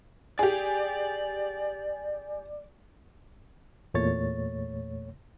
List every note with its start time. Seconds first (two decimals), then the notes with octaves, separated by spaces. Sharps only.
0.39 G4 G#4 D5
3.94 E2 A#2 A3 C#5 A6